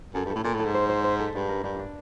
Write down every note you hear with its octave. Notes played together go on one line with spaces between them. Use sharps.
F#2 A4
G2
A4
A2
A#2 A4
A2
A4
G#2
C5
C5
C5
A4
G2 D4
A#4
G2 D4
D4